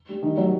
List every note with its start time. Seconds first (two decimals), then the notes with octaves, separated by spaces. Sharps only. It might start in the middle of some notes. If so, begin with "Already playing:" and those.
0.09 G3
0.23 D#3
0.37 F#3